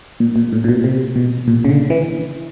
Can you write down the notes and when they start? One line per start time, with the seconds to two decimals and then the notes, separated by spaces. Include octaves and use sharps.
0.20 A#2
0.36 A#2
0.53 A2
0.64 A#2
0.68 B2
0.84 C3
1.16 B2
1.48 A#2
1.65 C#3
1.69 D3
1.90 E3